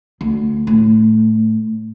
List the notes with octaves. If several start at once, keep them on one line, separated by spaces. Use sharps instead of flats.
D2
A2